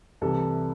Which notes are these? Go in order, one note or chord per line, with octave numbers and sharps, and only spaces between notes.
C2 C3 E3 A4